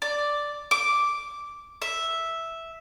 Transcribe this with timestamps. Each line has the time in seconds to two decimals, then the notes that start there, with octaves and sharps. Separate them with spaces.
0.02 D5
0.71 D6
1.82 E5